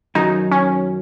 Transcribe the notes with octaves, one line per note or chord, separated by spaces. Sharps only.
F#2 D#3 F#3 D#4
C#4